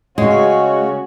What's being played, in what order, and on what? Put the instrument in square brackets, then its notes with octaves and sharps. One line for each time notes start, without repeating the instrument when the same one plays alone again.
[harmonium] C#3 C#4 C#5 [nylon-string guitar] G#3 [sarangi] F#4